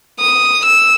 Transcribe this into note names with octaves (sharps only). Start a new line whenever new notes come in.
D#6
E6